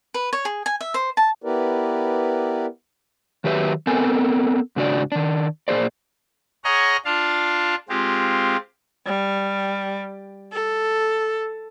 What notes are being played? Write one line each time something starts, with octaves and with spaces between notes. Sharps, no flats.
B4
C#5
G#4
G#5
E5
C5
A5
B3 E4 G4 A#4 B4 D5
D#3 F#3 G4 B4 E5
B3 C4 A4 A#4 G#5
G#2 C#3 D4 F#4 D5
D#3 D4
A#2 G#3 G#4 C5 D5
G#4 C#5 D#5 F#5 A#5 F6
D4 F4 F5 A5
G#3 C4 F4 G4
G3
A4